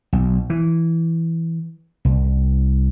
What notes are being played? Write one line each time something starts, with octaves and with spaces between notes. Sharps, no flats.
B1
E3
C2